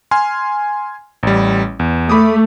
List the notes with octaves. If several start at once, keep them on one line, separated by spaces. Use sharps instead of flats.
G#5 C6 F6
A1 G3
E2
A3 B5 D6 D#6